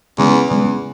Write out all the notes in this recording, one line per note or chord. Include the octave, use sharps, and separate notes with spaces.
E2 C#3 G#3 B3
E2 C#3 G#3 B3